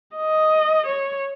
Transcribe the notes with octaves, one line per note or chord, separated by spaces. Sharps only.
D#5
C#5